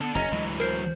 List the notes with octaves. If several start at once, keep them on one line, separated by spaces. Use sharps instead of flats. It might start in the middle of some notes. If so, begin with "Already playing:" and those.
B3 D4 A4
F#1 E2 C#4 D#5 A#5
D2 E3 F#3 G#3
A#4 C5 C7